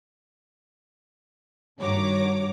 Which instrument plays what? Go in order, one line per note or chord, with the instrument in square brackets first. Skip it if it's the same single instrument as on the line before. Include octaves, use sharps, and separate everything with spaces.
[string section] G2 D#3 F#4 C#5 A#5 D6